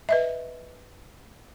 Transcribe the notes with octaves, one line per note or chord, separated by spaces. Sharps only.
B4 D#5 E5